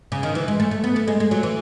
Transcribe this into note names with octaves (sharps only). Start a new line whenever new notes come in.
C#3
D#3
E3
G#3
A3
A3
B3
A3
G#3
G#3
F#3
E3